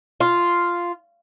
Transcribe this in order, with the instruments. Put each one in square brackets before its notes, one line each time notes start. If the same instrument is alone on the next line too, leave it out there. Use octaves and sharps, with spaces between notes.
[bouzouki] F4